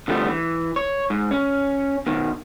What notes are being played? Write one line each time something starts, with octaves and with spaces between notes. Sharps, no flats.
D3 F3 G3 A3 B3
E3
C#5
G#2
C#4
B2 D#3